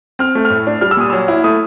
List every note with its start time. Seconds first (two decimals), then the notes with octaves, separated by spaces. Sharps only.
0.19 C4 F6
0.35 A3
0.45 F6
0.51 A2
0.67 D4
0.81 G3 F6
0.91 E6
0.97 A#2 D#6
1.10 F#3 E6
1.28 E4
1.44 A3 D#6